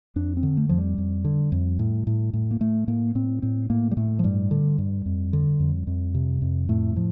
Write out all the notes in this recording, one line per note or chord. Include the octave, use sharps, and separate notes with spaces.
F2 D4
C4
D3
A3
F2 F3
G3
F2
D3
F2
A2
A2
A2
A#3
A2 A3
A2 A#3
A2 C4
A2 C4
A2 A#3
G3
A2 A3
F3
G2 G3
D3
G2
F2
D3
F2
F2
C3
F2
A2 A3
A2 F3